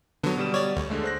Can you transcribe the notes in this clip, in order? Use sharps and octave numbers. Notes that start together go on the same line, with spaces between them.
D3 F#3 B3
B2 G3 E7
C#5 D5
D2
D3 G#3 A3
C5 F#6 A#6